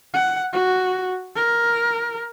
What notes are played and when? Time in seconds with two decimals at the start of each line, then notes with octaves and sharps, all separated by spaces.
0.14 F#5
0.53 F#4
1.36 A#4